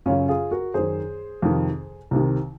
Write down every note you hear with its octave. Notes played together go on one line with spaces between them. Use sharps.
F#2 C#3 C#4 F4
F4 G#4
F#4 A#4
F#2 D#3 G#4 C5
F2 C3 D#3
C2 C3 D#3